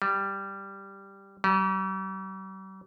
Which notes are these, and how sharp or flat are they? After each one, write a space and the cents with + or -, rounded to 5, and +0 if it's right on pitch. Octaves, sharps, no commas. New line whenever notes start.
G3 +0
G3 -45